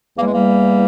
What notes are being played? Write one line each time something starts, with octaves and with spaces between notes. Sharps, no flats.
E2 E3 G3 A#3
G#3
G3 A#3